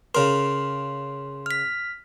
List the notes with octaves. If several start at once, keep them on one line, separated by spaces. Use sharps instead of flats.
C#3 A#4 C6
F6 B6